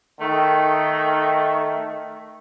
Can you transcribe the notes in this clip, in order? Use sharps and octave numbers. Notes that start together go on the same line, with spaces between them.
D#3 A3